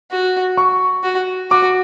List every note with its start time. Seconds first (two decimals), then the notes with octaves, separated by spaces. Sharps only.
0.11 F#4
0.57 C#6
1.03 F#4
1.50 F#4 D6